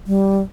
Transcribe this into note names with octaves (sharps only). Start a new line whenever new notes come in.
G3